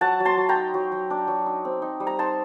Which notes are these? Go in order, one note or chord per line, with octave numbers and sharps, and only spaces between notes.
F#3 F#5 A5
F#3
A5 C6
F#3
G5 A#5
D#4
F#3
F#3
D4
F#3
D#4
C4
D#4
G3
A#5
D#4 A5 C6